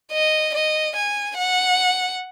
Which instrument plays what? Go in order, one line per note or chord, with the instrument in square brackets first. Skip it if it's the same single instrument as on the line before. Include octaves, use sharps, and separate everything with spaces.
[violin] D#5
D#5
G#5
F#5